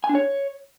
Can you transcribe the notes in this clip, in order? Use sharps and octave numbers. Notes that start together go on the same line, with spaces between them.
G#5
D4
C#5